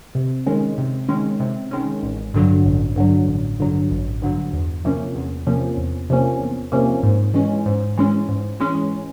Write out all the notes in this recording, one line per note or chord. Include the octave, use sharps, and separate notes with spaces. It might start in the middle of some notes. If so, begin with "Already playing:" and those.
C3
D#3 G#3 C#4
C3
D#3 G#3 C#4
C3
D#3 G#3 C#4
A1
G2 D3 F#3
A1
G2 D3 F#3
A1
G2 D3 F#3
A1
G2 D3 F#3
E2
C3 F3 A#3 C#4
E2
C3 F3 A#3 C#4
E2
C3 F3 A#3 C#4
E2
C3 F3 A#3 C#4
G#2
E3 G#3 C#4
G#2
E3 G#3 C#4
G#2
E3 G#3 C#4